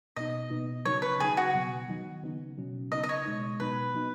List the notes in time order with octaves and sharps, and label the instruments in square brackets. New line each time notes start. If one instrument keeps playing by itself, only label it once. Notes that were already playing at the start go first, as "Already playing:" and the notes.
[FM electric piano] B2 B3 D#4 [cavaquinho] D#5
[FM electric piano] B2 B3 D#4
[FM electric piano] C#3 F#3 D#4 [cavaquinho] C#5
[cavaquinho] B4
[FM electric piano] C#3 F#3 D#4 [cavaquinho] G#4
[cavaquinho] F#4
[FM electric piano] B2 F#3 B3
D#3 F#3 D#4
C#3 B3 D#4
B2 F#3 C#4
[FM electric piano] C#3 B3 D#4 [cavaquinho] D#5
[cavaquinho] D#5
C#5
[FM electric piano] B2 G#3 D#4
[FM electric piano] B2 F#3 B3 D#4 [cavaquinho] B4
[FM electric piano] F#3 B3 D#4